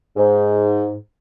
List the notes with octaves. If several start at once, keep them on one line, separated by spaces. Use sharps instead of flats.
G#2